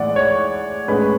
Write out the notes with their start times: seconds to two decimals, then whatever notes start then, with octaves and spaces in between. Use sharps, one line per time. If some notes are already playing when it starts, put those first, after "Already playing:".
Already playing: A2 E3 G#3 D5 F#5
0.16 C#5
0.88 A2 G#3 C#4 B4